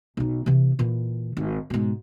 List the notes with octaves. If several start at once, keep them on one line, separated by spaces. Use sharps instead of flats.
B1 D#4
C3 E3
A#2 E3
G#1
G#2 B2